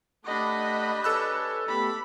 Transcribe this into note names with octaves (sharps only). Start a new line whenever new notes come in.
A3 D4 G4 A4 D#5 F#5 B5
A4 B4 C#5 G#5 E6 F#6
A3 B3 G4 B5 D6